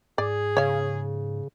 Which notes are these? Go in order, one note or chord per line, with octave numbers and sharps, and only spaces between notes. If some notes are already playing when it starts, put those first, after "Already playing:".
G#2 G#4 D5
C#3 C#5 F5